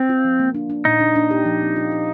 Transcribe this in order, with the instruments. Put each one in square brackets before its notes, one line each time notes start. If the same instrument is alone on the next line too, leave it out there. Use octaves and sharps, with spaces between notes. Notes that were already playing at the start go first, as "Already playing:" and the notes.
Already playing: [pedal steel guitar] C4
[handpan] F4
F3
A#3
D4
D4
[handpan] A#2 [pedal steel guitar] D#4
[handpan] D4
D4
G4
F3
C4
F4
F4